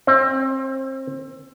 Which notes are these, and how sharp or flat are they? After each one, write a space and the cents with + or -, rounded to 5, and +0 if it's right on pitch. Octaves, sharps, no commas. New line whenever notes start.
C4 +30